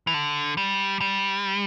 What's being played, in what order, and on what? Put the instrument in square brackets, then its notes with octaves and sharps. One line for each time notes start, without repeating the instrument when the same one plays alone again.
[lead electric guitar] E3
D3
G3
G3